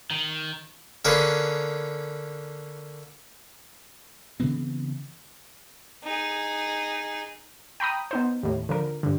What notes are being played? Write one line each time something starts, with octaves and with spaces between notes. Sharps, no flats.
D#3
D3 A#3 C#4 G#4 B4
C#3 E3 B3 C4
D#4 G#4
G5 A#5 B5 D#6
B3 D#4 C5
D#2 A2
D3 F3 A#4
G2 D3